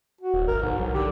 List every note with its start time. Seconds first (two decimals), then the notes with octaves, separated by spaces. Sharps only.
0.21 F#4
0.34 D1
0.48 G1 A#4
0.62 B1 G#2
0.79 F#3
0.94 D3 G4